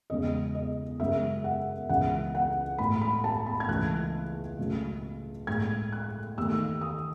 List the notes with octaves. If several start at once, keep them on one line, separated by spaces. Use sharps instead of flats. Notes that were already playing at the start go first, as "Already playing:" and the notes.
E2 C#3 G#3 D#5
D#5
F#2 C#3 G#3 E5
F#5
C#2 C#3 E3 F#5
F#5
A2 G#3 B5
B5
A5
B5
G#6
C#2 C#3 E3 A3 F#6
C#2 C#3 F#3 A3
A2 G#3 G#6
F#6
D#2 D#3 A3 E6
D#6